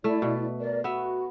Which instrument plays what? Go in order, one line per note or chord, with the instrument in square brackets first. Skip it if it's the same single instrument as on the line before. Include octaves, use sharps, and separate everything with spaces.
[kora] A3 [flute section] E4 D5
[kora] B2
[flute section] A#4 D5
[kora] B3 E5 [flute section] F#4